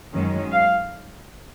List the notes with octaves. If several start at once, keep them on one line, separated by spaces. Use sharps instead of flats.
F#2 D#3 G#3 C#4
F5